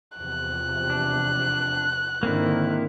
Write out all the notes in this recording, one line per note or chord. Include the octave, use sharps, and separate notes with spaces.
E2 C3 F3 F#6
D4
G#2 D3 D#3 A#3 C4 E4